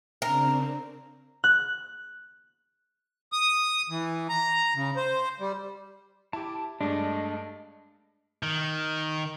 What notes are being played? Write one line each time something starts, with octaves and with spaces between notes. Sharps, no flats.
C#3 C4 D4 A#4
F#6
D#6
E3
A#5
C#3
C5
G3
E4 G4 A5 D6
G2 G#3 A3 D4 D#5
D#3